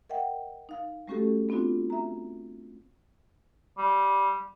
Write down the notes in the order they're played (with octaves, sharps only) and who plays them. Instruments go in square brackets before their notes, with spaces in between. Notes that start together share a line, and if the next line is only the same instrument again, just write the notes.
[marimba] A#4 D#5 E5 F#5 G5
D#4 F5
G3 A3 C#4 F#4 G4 A4
B3 C4 D4 F4 F#4
E5 A#5
[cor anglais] G3